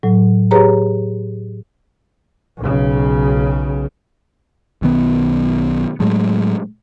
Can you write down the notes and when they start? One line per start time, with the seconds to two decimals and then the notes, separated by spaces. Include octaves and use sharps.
0.03 A2 F#3
0.51 G4 G#4 B4 C#5 A#5
2.59 B1 C#3
4.82 B1 D#3 B3
6.00 A2 F#3 G#3 A3